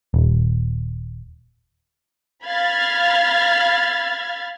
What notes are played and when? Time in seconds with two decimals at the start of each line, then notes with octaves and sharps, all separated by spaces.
0.14 D#1
2.46 F5 B5 F6 G#6 A6